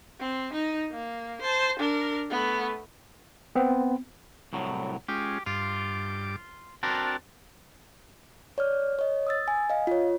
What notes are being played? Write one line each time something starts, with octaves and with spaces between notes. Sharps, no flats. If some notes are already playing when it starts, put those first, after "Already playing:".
C4
D#4
A#3
C5 A5
D4 A#4
A3 B3
B3 C4
C2 A2 F#3
G#3 C#4 F4 G4
G2 F4 D6
C4 D4 F#4 A#4 A5
C#5 D5 F6
C#5 D#5
D#6 E6 A6
G#5
D#5 F5
F4 C#5